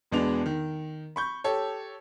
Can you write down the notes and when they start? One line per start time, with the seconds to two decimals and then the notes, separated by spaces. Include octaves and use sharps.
0.11 E1 E2 G#3 B3 D4 F7
0.46 D#3
1.16 B5 C#6 G6
1.44 G4 A4 C#5